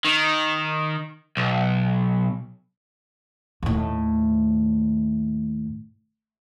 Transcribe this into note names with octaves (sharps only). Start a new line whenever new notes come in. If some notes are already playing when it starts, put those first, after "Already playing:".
D#3
B1
D#2 A2